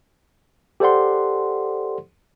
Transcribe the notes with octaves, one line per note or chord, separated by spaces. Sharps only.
G4 A4 C5 D5 F#5 C6